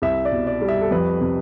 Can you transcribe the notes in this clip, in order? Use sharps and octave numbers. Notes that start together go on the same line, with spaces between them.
C2 E5
D5
B2
D5
G3
E5
A4
F2 B4
C3